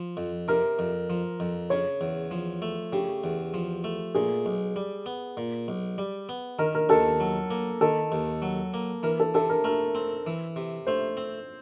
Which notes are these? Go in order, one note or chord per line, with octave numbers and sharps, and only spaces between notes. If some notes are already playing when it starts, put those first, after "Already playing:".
Already playing: F3
F2
C3 A#4
F2
F3
F2
C#3 C#5
E2
F3
A3
C#3 G4
E2
F3
A3
A#2 G#4
B1
G3
B3
A#2
B1
G3
B3
D#3 A#4
A#4
D#2 A4
F#3
A#3
D#3 A4
D#2
F#3
A#3
E3 A#4
A4
C3 A4
A#4
A3 A#4
C4
E3
C3
A3 C5
C4